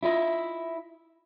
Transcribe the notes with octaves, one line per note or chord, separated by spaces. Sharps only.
E4 F4 D#5 E5